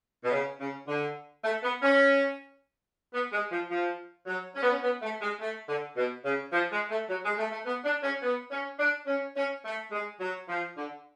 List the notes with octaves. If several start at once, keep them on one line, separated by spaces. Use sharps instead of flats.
B2
C#3
C#3
D3
A3
B3
C#4
B3
G#3
F3
F3
F#3
C#4
B3
C#4
B3
A3
G#3
A3
D3
B2
C#3
F3
G#3
A3
F#3
G#3
A3
A3
B3
D4
C#4
B3
C#4
D4
C#4
C#4
A3
G#3
F#3
F3
D3